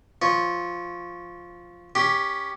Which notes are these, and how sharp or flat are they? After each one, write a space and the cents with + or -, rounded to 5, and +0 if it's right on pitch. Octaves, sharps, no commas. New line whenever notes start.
F3 +0 C#5 +0
C#4 +10 G4 +10